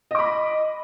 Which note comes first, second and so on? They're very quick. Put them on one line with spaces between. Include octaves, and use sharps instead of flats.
D#5 D6 B5